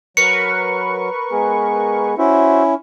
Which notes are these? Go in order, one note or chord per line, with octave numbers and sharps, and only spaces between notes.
F#3 A#4 B4 C#6 C#7
G#3 B3 G#4
C#4 E4 F#4 C5 E5